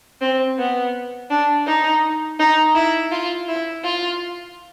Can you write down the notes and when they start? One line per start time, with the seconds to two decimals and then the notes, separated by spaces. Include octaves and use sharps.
0.21 C4
0.58 B3
1.30 D4
1.67 D#4
2.39 D#4
2.75 E4
3.12 F4
3.48 E4
3.84 F4